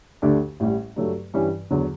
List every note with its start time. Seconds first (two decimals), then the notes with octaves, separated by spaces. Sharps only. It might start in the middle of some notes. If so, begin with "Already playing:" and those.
0.22 D2 D3 A3 D4 G4
0.60 A1 A2 G3
0.96 G2 F#3 A3
1.34 G2 E3 G3 C#4
1.70 E2 D3 F#3